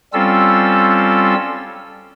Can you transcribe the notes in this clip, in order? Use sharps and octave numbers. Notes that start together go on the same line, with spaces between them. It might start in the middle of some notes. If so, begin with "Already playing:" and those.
G3 C4 C#4 F4 A4 E6